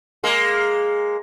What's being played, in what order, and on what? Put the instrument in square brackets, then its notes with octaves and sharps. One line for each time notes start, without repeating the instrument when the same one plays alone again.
[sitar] G#3 A#3